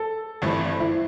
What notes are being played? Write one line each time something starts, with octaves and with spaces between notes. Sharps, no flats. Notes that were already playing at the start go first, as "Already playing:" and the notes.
Already playing: A4
G1 G2 E3 A3 C4
E4